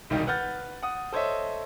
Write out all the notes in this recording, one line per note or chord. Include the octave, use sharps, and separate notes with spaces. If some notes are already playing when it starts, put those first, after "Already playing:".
E1 C2 D#3 G3 D#4
B4 F#5 F6 G6 A6
F#5 D#6
A4 C5 C#5 D#5 E5